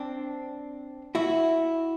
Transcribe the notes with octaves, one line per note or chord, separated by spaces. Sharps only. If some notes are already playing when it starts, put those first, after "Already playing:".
Already playing: C4 D4
E4 F#4